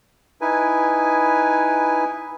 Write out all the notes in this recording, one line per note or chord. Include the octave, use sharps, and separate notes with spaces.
D#4 E4 B4 G#5